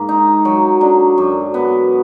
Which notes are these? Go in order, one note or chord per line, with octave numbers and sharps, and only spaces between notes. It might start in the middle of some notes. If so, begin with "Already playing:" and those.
Already playing: G#2 A#3
D#4
F#3
D3
F#2
B3